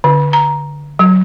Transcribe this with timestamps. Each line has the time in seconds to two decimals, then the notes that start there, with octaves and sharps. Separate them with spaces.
0.04 D3
0.33 A#5
0.99 F#3